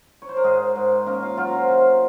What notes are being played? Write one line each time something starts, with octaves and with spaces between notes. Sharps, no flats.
C#5
C5
A#4
G#2 G#3 G#4
G#2
A#3 C#4 A#4
F4 F5
F#3 F4 F5
A#5
C5 C6
C3 C5 C6